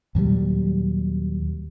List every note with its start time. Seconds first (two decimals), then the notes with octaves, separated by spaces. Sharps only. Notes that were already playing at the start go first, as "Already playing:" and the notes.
0.15 D#2 A#2 F#3 G3